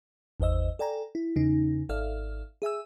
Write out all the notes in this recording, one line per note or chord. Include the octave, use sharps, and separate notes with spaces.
G#1 E2 C5 D#5 E6
A4 D5 G5 G#5 A#5
E4
E2 C#3 D#4
G#1 A4 D5 E5 F5 F6
G#4 E5 G#5 E6